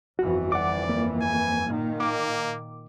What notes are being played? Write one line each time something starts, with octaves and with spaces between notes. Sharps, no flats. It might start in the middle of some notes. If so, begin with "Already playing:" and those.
G1 F2 E3 F#4
D5 F#5 D6
A#3
G#5
A#2 D#3
A#3 D6